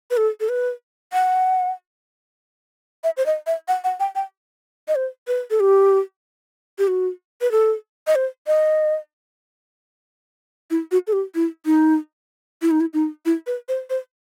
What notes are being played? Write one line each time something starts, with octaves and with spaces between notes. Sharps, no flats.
B4
A4
A4
B4
F#5
E5
C5
D#5
E5
F#5
F#5
G5
G5
D#5
C5
B4
A4
G4
G4
F#4
B4
A4
D#5
C5
D#5
E4
F#4
A4
G4
E4
D#4
E4
D#4
E4
D#4
E4
B4
C5
C5